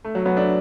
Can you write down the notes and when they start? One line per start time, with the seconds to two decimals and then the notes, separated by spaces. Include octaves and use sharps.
0.05 A3
0.15 F#3
0.25 F#3 B3
0.37 A3 D4